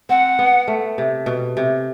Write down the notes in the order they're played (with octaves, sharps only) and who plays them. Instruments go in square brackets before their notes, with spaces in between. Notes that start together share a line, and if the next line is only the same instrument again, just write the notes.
[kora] C4 [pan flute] F#5
[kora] B3
A3
C3
B2
C3